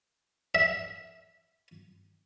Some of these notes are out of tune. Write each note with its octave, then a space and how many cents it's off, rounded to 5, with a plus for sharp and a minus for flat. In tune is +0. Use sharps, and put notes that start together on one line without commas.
E5 -15